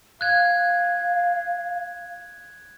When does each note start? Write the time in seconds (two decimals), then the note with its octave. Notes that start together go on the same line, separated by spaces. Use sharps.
0.21 F5 F#6 G#6